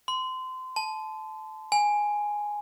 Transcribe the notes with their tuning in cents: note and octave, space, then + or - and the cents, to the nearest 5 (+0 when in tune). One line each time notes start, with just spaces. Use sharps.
C6 -25
A5 -20
G#5 +0